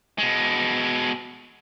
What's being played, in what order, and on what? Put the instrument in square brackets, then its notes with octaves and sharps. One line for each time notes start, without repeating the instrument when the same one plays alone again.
[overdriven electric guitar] B2 G#3